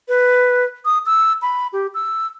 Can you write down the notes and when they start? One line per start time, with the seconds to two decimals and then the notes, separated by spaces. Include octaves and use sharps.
0.08 B4
0.85 D#6
1.06 E6
1.42 B5
1.73 G4
1.95 E6